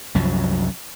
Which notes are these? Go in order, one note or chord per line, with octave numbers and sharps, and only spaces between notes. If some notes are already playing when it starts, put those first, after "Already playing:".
C2 F#2 F3 F#3